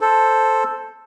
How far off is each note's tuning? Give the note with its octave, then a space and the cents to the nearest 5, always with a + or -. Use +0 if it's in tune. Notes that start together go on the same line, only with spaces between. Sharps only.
A4 +0 C5 +0